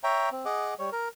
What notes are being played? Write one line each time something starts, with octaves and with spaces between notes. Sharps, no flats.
C#5 E5 G5 A#5
C4
G#4 D#5 F#5 D6
G3 C#5
A#4